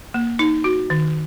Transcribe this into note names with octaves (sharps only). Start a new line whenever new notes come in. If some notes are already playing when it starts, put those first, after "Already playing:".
A#3
D#4
F#4
D#3